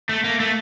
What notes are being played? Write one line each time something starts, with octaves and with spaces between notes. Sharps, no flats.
A3
A#3
A3